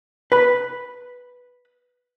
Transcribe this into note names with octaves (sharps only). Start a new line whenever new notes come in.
B4 B5